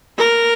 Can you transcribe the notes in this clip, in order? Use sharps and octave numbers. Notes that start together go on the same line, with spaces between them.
A#4